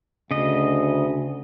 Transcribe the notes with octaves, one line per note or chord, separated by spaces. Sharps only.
D2 C#3 D#5